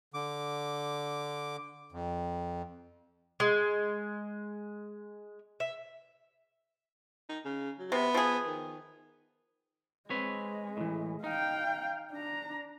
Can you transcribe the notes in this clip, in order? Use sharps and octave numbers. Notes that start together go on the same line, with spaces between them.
D3 D6
F2
G#3
E5
D#4
C#3
F#3
C3 B3
F3 G#4
D#3
G#3 C4 B4 C#5
A2 E3
D#4 F5 G5
D4 A#5